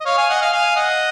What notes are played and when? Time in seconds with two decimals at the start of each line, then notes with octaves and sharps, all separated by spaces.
0.01 D#5
0.05 C#5 F5
0.18 F5 G#5
0.30 D#5 F#5
0.41 F5 G#5
0.53 F5 G#5
0.76 D#5 F#5